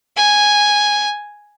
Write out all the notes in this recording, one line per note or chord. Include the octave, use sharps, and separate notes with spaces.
G#5